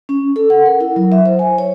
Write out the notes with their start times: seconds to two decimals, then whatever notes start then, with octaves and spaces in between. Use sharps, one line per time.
0.09 C#4
0.36 A4
0.50 F#5
0.66 A#4
0.81 E4
0.96 F#3
1.12 E5
1.26 C5
1.39 G#5
1.58 C#5